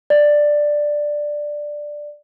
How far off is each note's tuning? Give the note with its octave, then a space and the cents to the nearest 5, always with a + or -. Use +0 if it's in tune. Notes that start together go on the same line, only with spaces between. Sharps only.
D5 +5